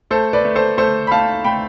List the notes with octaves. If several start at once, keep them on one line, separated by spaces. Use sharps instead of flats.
A3 A4 C5
B4 D5
A3
A4 C5
A3 A4 C5
B5
A3 F5 A5
A3 G5 B5